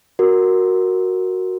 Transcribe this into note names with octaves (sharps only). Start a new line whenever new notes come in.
F#4 A#4